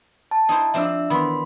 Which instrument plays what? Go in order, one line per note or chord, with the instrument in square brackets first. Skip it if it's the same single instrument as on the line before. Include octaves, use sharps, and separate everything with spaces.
[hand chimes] A5
[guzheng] D#4 E4 C5
[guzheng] F3 C4 D4 [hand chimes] E5 E6
[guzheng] D#3 E3 B3 [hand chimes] B5 C6